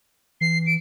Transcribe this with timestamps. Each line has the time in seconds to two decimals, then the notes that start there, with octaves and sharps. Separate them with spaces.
0.41 E3 C7
0.66 D7